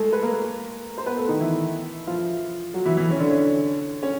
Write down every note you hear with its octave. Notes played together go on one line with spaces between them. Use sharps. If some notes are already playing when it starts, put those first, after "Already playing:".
Already playing: G#3 A3 G#4 A4
B4
A#3 A#4
C5
B3 B4
A3 A4
D#3 D#4
E3 E4
F3 F4
F#3 F#4
E3 E4
E3 E4
C#4
D3 D4
C#4
C#4